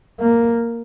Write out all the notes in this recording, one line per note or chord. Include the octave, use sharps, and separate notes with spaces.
A#3